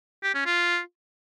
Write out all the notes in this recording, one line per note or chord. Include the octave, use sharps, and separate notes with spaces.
G4
C#4
F4